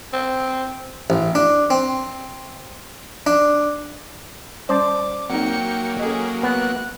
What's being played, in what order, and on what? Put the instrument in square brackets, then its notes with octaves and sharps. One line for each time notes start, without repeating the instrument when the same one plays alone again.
[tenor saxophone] C4
[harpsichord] A1
D4
C4
D4
[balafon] G3 C#4 [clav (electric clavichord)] C5 D5 A5 [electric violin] D6
[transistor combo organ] F#3 A#3 [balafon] C4 D#4 [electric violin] G5 C#7
[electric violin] C#4 G#4 [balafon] A4 D#5
[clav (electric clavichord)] B3 [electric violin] F#6